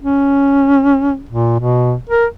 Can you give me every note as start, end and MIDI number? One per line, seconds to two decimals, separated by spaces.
0.02 1.21 61
1.29 1.59 46
1.60 1.95 47
2.09 2.25 70